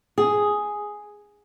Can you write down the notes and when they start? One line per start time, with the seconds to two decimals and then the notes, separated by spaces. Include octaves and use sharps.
0.18 G#4